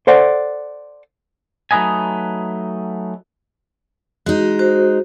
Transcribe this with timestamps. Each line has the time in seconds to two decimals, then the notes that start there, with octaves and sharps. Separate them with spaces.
0.07 A4 C5 D5 F#5
1.71 F#3 A3 D#4 B4 D#5 G#5
4.26 G#3 D#4 F#4
4.59 F#4 C5